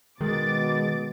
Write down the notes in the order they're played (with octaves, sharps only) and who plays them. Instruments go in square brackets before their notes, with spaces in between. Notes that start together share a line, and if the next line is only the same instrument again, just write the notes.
[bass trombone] B2 [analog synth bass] D#3 [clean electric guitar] G#3 [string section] D6 A6